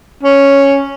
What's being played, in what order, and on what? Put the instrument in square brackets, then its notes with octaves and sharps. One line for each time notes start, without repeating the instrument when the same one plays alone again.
[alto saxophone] C#4